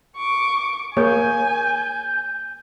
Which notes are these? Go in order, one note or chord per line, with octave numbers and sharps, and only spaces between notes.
C#6 D6
A#3 G#4 C#5 G#5 G6